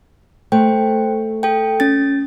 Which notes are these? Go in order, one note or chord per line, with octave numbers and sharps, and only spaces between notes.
A3 C5 G5
A4 G5
C#4 A6